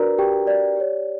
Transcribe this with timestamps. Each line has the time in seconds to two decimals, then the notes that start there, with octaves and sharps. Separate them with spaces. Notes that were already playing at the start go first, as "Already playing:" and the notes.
Already playing: D4 F#4 A#4 B4 D5 A#5
0.19 G4 G5
0.47 D5
0.76 G4 C#5